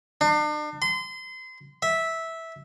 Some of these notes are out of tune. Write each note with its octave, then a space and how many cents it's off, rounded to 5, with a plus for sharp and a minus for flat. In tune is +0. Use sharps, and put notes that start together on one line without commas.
D4 +40
C6 -30
E5 -10